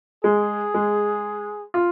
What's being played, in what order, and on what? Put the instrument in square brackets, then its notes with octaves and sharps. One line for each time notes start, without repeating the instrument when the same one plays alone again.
[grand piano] G#3 [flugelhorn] G#4
[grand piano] G#3
F4